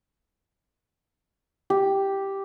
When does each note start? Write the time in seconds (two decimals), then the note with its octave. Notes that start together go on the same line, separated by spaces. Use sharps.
1.70 G4